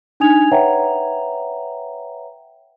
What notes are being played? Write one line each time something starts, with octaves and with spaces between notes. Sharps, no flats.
D4 D#4 G#5 D#6 G#6 F7
B4 C#5 E5 F#5 G5 A#5